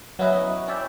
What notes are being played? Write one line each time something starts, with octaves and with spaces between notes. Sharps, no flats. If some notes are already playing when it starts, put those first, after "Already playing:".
F#3 B3 C#4 E4 B4 D#5
C#4 E4 D5 E5 G5